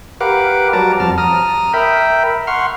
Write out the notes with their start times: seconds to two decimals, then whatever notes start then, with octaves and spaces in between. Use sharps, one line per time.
0.21 G4 A#4 B4 F5 F#5 D6
0.73 F#3 G3 A5 A#5 D6
1.00 F2 A5 F6
1.18 A#5 D#6 F6
1.74 A#4 E5 G5 B5
2.47 F#5 C6 C#6 F6